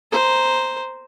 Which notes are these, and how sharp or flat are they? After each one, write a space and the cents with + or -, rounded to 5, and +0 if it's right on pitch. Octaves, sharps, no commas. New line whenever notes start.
C5 +0 A#5 +0